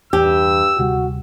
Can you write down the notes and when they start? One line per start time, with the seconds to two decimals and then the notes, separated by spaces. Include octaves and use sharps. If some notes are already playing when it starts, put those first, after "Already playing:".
0.13 E2 G2 G4 E6
0.79 D2 C3 G3 F#4